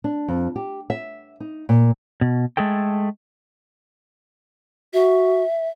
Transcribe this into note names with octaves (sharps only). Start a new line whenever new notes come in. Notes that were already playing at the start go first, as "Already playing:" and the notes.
D4
F2
G4
E5
D#4
A#2
B2
G#3 A3 G#4 A4 G5
F#4 E5